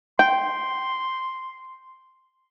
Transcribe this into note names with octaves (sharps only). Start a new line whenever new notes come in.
G5 C6